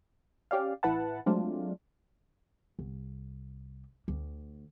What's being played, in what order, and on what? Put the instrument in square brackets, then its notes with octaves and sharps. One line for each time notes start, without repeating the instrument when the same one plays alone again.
[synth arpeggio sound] C#4 G4 D5 F5
A1 E4 B4 F#5 A5
F#3 G#3 A3 C4 D4 F4
[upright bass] C2
D2